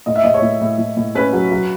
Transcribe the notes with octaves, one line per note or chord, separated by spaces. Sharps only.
A2 D#5
E5
A2 D#5
C#5
A2
A2
A2
A2
C#4 B4
F#3
F#3